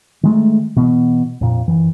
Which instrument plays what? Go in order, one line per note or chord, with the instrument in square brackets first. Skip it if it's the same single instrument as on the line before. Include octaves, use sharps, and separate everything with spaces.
[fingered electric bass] D#3 G#3 A3
B2 E3 B3
F2 A#2
F#2 E3